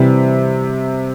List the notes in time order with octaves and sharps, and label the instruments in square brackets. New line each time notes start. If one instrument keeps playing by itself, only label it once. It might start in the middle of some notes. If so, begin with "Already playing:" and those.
Already playing: [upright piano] C3 G3 C4 [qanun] E3